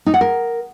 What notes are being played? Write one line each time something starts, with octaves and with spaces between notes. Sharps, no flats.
D#4
F#5
A#4